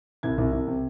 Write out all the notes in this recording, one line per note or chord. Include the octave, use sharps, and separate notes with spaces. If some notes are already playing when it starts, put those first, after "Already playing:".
C2 G#6
C2
C2
C3